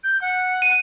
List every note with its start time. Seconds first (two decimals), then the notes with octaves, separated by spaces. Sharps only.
0.04 G6
0.21 F#5
0.62 D#7